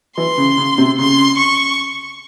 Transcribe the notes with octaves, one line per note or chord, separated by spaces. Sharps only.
E3 C6
C#3
C#3
C3
C#3 C6
C#6